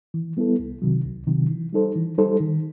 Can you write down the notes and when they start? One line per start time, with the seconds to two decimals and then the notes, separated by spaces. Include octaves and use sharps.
0.14 E3
0.37 G3 B3 E4 A4
0.59 C2
0.82 C3 D#3 F#3
1.05 C2
1.27 C3 D#3 F#3
1.50 E3
1.73 G3 D#4 A4 C5
1.96 E3
2.18 G3 D#4 A4 C5
2.41 D#3